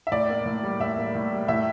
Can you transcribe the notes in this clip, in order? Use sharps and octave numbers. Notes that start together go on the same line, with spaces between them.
E5
A2 D5
A#3
A2
G3
A2 E5
A#3
A2
G3
A2 E5